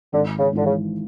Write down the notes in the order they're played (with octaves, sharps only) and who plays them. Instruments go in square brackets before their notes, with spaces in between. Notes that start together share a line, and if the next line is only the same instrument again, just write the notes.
[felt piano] G#1 [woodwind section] D3
[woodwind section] C#3
[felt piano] G#2 E3 [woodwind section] D3
[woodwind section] C#3